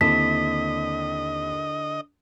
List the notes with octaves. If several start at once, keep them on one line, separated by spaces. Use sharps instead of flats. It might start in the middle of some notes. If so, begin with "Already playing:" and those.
D#2 D3 C4 E4 D#5 A5 B6